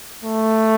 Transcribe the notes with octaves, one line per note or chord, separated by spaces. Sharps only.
A3